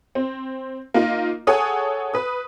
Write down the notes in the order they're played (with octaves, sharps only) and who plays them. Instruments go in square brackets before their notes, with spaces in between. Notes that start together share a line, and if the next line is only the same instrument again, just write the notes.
[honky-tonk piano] C4
A#3 D#4 F4
G#4 A4 C#5 F#5 G#5 D#6
B4 D#6